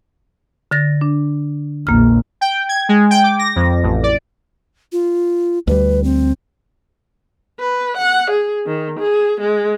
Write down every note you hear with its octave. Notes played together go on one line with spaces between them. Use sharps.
D3 A6 A#6
D4
A#1 E2 A#3 F6
G5
G#6
G#3
G5
D6
A#6
F2
A1
D5
F4
D2 G3 B4
C4
B4
F#5
G#4
D#3
G#4
G#3